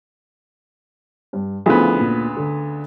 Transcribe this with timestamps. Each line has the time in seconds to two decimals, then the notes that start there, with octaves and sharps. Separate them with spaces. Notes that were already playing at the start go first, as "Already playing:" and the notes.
1.33 G2
1.66 D2 C#3 F3 B3 E4 G#4
2.00 A#2
2.37 D3